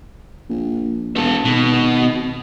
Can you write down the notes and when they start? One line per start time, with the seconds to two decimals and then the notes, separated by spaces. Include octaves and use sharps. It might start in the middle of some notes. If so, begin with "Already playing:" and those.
0.49 A#1
1.16 E1 B3 A4
1.45 G#1 B2